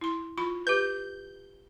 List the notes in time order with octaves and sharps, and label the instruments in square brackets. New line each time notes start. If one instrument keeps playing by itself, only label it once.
[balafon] E4 C6
F4 B5 C#6
[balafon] G4 B4 [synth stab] G6